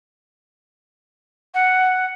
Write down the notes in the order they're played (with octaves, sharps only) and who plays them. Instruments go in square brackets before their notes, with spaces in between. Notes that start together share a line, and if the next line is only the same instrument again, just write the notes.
[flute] F#5